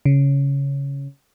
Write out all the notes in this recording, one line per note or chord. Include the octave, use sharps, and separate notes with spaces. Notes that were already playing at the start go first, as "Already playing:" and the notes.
C#3